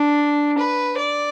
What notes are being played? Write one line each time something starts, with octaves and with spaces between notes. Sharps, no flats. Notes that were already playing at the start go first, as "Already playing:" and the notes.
Already playing: D4
B4
D5